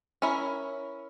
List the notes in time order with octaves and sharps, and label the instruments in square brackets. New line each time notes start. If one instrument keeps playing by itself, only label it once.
[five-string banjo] C#4 E4 A#4